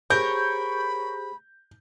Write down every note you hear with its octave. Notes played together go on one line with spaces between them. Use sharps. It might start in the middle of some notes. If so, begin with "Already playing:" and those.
G4 G#4 A#4 C5 C#5 B5 G6